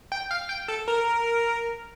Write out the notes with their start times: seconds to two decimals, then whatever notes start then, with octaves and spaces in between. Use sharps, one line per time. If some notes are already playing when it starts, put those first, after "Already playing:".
0.12 G5
0.31 F5
0.49 G5
0.68 A4
0.88 A#4